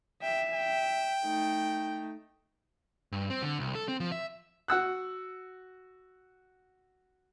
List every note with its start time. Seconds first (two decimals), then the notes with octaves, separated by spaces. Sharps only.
0.22 E5 G5
0.54 G5
1.24 A3 D#4
3.12 G2
3.30 C4
3.42 D3
3.59 C2
3.75 A4
3.88 C4
4.00 F3
4.12 E5
4.68 F#4 F#5 E6 F#6